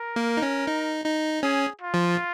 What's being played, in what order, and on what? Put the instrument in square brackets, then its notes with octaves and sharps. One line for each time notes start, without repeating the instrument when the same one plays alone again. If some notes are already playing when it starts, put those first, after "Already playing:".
Already playing: [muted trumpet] A#4
[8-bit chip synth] A#3
D#4
C#4
D#4
D#4
[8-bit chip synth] C#4 [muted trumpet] G#4
[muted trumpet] F4
[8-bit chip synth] F3